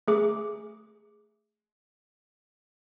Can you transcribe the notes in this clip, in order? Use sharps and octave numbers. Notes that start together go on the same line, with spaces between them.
A3 G#4 D6